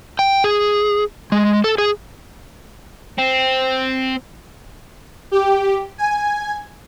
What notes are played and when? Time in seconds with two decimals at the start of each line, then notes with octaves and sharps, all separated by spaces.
0.19 G5
0.44 G#4
1.32 G#3
1.64 A4
1.78 G#4
3.18 C4
5.31 G4
5.98 G#5